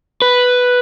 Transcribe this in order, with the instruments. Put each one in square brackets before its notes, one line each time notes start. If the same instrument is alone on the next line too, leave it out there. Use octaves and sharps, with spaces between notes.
[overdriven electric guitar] B4